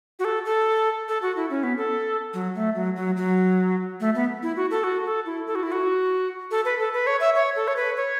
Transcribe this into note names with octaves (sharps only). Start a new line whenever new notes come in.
F#4
A4
A4
A4
F#4
E4
C#4
B3
A4
F#3
A3
F#3
F#3
F#3
A3
B3
E4
F#4
A4
F#4
A4
E4
A4
F#4
E4
F#4
A4
B4
A4
B4
C#5
E5
C#5
A4
C#5
B4
C#5